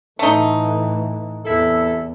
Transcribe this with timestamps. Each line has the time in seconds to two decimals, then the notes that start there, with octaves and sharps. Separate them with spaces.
0.19 A2 E3 A3 D#4
1.46 E2 C3 E4 A4